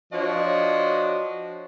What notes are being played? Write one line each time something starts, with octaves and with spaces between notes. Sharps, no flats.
F3 D4 F#4 C5 C#5 D#5